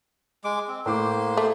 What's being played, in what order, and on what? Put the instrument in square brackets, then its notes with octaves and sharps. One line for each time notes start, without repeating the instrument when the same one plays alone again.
[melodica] G#3 D6
C4
[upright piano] A2 D6 [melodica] A#3 C5
[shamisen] A3